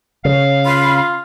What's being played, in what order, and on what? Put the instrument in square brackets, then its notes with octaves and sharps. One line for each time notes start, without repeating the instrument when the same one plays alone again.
[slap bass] C#3 [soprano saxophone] F5
[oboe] F4 [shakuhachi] B5